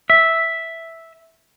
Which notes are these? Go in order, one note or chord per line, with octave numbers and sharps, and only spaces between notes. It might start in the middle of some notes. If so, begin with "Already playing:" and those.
E5